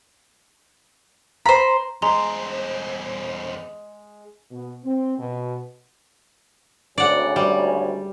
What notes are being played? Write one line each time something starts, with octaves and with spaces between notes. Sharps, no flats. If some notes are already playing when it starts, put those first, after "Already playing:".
C5 A#5 B5
E2 G#3 C5 A#5 C6
B2
C4
B2
G#1 D2 C#4 D5 F#5
G3